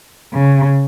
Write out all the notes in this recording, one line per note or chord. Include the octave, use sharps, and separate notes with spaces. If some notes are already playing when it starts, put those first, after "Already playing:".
C#3